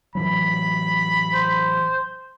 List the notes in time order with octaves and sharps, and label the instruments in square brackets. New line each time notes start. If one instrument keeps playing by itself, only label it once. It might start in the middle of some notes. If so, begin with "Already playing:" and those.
[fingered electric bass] A2 E3 F#3 [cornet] B5
[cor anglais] C5